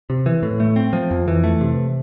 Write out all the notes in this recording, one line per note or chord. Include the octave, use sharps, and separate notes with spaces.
C3
E3
A2
A3
C4
F3
F2
E3
A3
C3